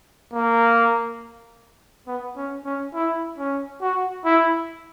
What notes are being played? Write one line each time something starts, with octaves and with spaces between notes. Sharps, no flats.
A#3
B3
C#4
C#4
E4
C#4
F#4
E4